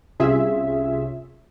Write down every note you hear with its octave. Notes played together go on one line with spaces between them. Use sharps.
C2 C3 C#4 F4 G#4 E5